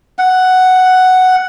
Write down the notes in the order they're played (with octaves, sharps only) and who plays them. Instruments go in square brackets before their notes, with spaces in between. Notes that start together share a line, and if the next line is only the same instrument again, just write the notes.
[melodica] F#5